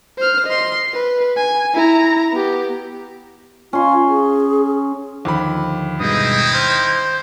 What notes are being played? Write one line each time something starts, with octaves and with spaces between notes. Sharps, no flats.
C5 F6
D#5 C6
B4
G#5
E4 A#5
B3 G4
C#4 F4 C6
G#4
D#2 D3 F3 B5 D6
G2 B2 G#3 C4 D#4 E4 D#6
C5 F6